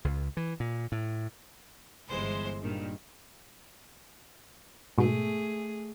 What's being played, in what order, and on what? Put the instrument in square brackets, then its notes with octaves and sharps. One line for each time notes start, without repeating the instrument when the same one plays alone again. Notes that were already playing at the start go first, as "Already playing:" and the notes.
[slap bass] C#2
E3
A#2
A2
[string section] G1 E3 G#3 C5
G2 A#2 D#3
[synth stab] G#2 B2 [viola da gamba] A3 G#4